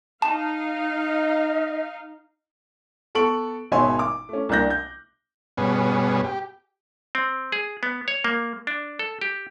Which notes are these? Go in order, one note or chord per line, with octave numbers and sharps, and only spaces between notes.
D#4 F5 A5
D#5
B3 A4 C#6 D7 F#7
G#1 B2 C#5 E5 G#5 C6
D6
A3 C#4
C2 A#3 D4 F#6 G6 A#6
G6
G2 B2 B3 C#4 G#4
G4
C4
G#4
B3
C#5
A#3
D4
A4
G4